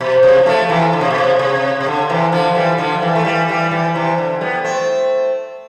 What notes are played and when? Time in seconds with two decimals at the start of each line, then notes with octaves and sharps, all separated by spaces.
0.01 B2
0.23 C3
0.46 F3 A3
0.69 C3 E3
0.93 D3
1.01 C3
1.10 B2
1.18 C3
1.39 C3
1.80 C3
1.86 D3
2.10 C3 E3
2.32 D3 F3
2.55 E3 G3
2.78 D3 F3
3.02 E3 G3
3.16 A3
3.25 E3 G3
3.49 E3 G3
3.71 E3 G3
3.95 C3 E3
4.18 D3
4.41 G3 B3
4.65 A3 C4